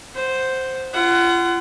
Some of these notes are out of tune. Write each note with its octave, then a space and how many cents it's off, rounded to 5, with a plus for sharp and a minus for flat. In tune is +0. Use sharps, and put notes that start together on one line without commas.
C5 +0 F#5 +0
F4 -30 F#5 +20